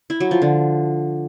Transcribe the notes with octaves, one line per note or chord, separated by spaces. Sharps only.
E4
F#3
F3
D3